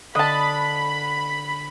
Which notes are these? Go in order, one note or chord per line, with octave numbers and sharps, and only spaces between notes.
D3 D#5 A5 B5